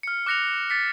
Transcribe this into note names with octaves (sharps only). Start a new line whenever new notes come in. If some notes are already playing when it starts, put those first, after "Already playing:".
F6 C#7
D6 F#6 A#6 C#7 F7
A6 B6 C#7